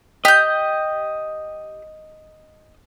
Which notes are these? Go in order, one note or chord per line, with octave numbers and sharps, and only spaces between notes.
G4 D#5 G6